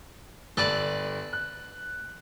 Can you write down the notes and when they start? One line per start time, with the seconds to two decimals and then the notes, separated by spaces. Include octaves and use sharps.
0.57 G1 A4 B4 D5
1.33 F#6